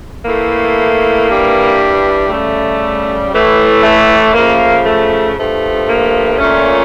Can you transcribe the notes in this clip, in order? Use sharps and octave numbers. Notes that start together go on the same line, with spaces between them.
A2 E3 A3 A#3
G2 E3 G3
C#3 G3 A3
A2 E3 A3
A3
C#3 F3 A3 A#3
A3
G2 F3 A3
A#3
A#2 A3 C#4